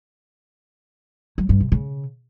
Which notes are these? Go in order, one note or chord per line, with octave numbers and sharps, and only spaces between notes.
F#3
G2
C3
C#3